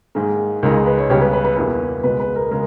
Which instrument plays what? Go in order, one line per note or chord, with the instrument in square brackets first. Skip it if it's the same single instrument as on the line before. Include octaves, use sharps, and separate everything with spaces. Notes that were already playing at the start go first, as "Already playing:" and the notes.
[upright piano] G#2 D#3 A#3 [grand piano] G#4
[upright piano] C#2 C#3 G#3 D#4 [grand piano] A#4
[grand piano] B4
C#5
[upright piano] C#2 C#3 G3 B3 G4 [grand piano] C#5
[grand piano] B4
B4
B4
[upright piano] E2 B2 G3 A#3 E4 [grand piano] B4
[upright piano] C#2 B2 G#3 [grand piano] B4
[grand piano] B4
A#4
[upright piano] C#3 G#3 [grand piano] A#4